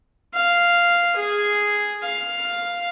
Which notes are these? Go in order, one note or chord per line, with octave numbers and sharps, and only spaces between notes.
F5
G#4
F5